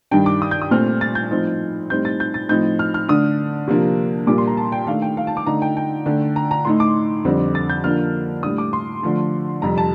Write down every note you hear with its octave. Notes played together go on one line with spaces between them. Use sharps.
G2 D#3 G3 D4 G5
D6
D#6
G6
D#6
A#2 A3 C4 F6
A6
G6
A2 F3 C4 D#4
A2 G3 C4 D#4 G6
A6
G6
A6
A2 F3 C4 D#4 G6
F6
F6
D3 A3 D4 D#6
C3 F3 A#3 D4
A#2 G3 A#3 D6
C6
A#5
A5
G5
D#3 A3 D4 F5
G5
F5
A5
D6
D3 A3 D#4 A#5
G5
G5
D3 A3 D4
A#5
A#5
A2 A3 D#4 C6
D6
F2 D3 G3 C4
A6
G6
D3 F3 A#3 D4 F6
A2 G3 D4 D#6
D6
C6
D3 F3 A3
F2 C3 G3 A#5
A5